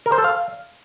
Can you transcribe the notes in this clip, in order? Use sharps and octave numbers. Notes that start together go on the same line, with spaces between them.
A#4
C5
A4
F5